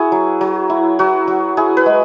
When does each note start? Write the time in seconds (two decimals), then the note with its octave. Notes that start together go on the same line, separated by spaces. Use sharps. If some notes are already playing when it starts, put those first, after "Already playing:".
Already playing: E4 F#4 G#4
0.12 F#3
0.41 F#3
0.70 E4
0.99 F#3 F#4
1.27 F#3
1.57 E4 G#4
1.77 B4
1.86 G#3